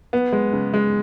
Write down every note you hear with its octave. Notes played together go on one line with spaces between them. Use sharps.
B3
G#3
C#3
G#3